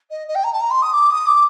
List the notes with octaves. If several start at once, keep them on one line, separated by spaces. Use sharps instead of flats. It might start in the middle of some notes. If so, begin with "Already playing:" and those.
D#5
D#5
G5
A#5
A5
A#5
C6
D#6
D6
D#6
D6